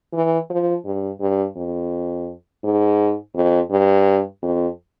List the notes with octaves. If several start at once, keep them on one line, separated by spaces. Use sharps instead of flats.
E3
F3
G2
G2
F2
G#2
F2
G2
F2